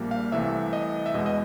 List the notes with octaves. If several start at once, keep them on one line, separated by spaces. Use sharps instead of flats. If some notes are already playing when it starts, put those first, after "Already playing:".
Already playing: A#1 A#2 G3 A#3
F5
C2 C3 E3 A3 E5
D#5
E5
E2 B2 G#3 B3 D#5
D#5